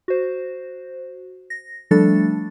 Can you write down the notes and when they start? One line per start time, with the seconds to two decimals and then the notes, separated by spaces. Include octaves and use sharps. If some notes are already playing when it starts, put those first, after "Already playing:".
0.08 F#4 C5
1.50 A#6
1.91 F3 G3 A3 D4 A4 A6